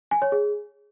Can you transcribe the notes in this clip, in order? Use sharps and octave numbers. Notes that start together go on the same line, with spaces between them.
G#5
C#5
G#4